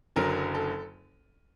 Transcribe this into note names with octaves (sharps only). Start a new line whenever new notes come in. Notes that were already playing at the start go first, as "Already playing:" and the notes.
F#1 F#2 D3 F#3 A#4
A4